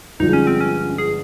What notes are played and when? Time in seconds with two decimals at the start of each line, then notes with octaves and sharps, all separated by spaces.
0.19 G1 G2 F3 G#3 D#4
0.33 C#4
0.47 C4
0.60 C#4
0.98 G#4